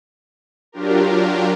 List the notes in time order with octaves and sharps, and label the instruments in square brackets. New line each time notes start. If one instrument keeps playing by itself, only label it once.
[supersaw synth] F#3 D4 F4 G4 A#4